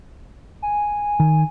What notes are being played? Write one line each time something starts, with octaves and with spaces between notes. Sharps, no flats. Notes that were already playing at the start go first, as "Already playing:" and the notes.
G#5
D#3